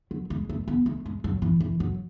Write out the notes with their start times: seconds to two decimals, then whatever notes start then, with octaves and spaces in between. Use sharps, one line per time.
0.11 F#3
0.30 G#3
0.49 A3
0.68 B3
0.86 A3
1.06 G#3
1.24 F#3
1.42 E3
1.60 E3
1.80 F#3